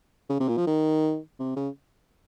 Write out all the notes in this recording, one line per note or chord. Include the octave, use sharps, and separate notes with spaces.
C#3
C3
A#2
F3
D#3
C3
C#3